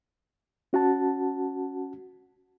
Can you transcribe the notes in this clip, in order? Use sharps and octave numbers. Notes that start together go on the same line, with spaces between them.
C#4 F#4 F#5 A5